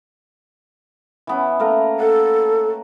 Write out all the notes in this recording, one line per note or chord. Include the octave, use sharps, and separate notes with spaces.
E3 B3 C#4
A3 A#3 A#4
A4 F#5